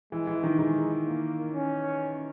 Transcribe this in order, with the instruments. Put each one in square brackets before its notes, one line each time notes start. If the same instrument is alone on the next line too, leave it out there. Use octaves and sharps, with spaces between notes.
[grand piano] E3 [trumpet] G#3
[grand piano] E3
D#3
[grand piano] D#3 [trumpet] G#3
[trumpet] A#3
C#4